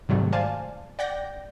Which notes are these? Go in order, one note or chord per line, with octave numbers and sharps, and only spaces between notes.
G#2 C3 D#3 F#3 G3 A3
C5 D5 F5 G#5 A5
D5 F#5 G5 G6 A#6